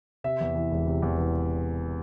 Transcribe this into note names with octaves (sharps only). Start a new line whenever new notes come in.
C3 E5
E2
E3
E1
C3
E2
E3